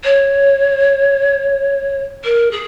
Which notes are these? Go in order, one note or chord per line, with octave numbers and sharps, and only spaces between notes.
C#5
A#4
G#4